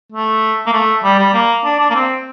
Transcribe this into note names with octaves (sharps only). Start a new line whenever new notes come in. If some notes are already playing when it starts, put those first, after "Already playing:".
A3
A#3
A3
G3
G3
A#3
D4
D4
A#3
C4